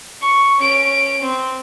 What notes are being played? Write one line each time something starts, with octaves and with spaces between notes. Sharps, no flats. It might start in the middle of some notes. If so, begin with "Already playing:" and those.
C#6
C#4 D7
C4